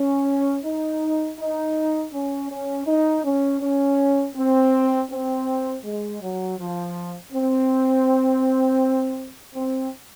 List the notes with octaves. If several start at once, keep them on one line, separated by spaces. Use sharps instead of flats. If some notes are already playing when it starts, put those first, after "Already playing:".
Already playing: C#4
D#4
D#4
C#4
C#4
D#4
C#4
C#4
C4
C4
G#3
F#3
F3
C4
C4